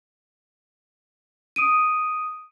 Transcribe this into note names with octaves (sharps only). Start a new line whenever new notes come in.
D#6 D7 D#7